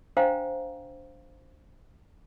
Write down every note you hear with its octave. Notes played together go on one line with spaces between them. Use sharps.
D4 C5 F5 G5 A#5